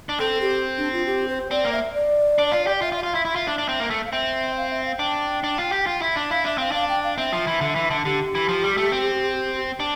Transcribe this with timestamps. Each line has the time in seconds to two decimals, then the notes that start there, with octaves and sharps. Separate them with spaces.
0.09 D4
0.19 C4 A4
0.41 G4
0.78 D4
0.92 F4
1.06 G4
1.29 C5
1.51 C4 D5
1.65 A#3
1.72 E5
1.94 D5
2.38 D4
2.52 F4
2.67 G4
2.81 F4 E5
2.92 F4
2.96 E5
3.03 F4 F5
3.15 E4
3.25 E4 E5
3.36 F4
3.47 D4
3.58 D4
3.69 C4
3.80 A#3
3.91 A3
4.05 F5
4.12 C4 E5
4.57 F5
4.70 E5
4.85 F5
4.99 D4 G5
5.44 D4
5.58 F4
5.72 G4
5.87 F4
6.02 E4
6.16 D4
6.31 E4 F5
6.44 D4 E5
6.58 C4 F5
6.72 D4 F5
6.89 G5
7.03 F5
7.17 C4 E5
7.33 F3
7.47 E3
7.61 D3
7.76 E3
7.90 D3
8.05 D3 G4
8.35 E3
8.49 F3
8.64 G3
8.78 A3
8.92 C4
9.80 D4